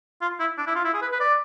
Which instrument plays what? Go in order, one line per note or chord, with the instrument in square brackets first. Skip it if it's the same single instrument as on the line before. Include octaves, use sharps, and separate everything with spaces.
[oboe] F4
E4
D4
E4
F4
E4
G#4
B4
B4
D5